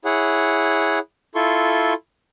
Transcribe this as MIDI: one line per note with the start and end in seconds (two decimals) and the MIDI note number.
0.05 0.99 64
0.05 0.99 68
0.05 0.99 73
0.05 0.99 78
1.35 1.94 64
1.35 1.94 65
1.35 1.94 69
1.35 1.94 84
1.35 1.94 85